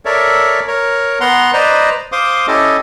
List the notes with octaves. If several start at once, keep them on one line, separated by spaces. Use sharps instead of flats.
A4 A#4 C#5 D5 E5
A#4 C#5
B3 F#5 A#5 C6
B4 C5 D5 D#5 A#5
C5 F5 C6 D6 D#6
C#4 E4 G4 A4 D#5